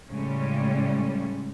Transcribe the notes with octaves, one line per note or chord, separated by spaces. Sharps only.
A2 C#3 G3 G#3 C#4